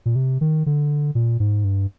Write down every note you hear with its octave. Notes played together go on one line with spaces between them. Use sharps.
A#2
C3
D#3
D3
A#2
G#2
G2